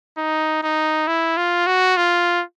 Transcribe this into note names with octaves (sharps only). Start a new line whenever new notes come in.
D#4
D#4
E4
F4
F#4
F4